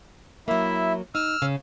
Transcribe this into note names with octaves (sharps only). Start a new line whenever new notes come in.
F#3 A#3 E4 E5
D#4 E6 F6
C#3